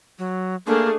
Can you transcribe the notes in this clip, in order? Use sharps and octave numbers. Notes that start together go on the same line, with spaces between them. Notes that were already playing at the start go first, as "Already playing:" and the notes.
F#3
A3 A#3 D4 G#4